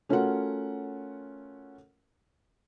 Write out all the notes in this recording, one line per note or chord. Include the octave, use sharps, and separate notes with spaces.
A3 C#4 F4 F#4 A#4 F#5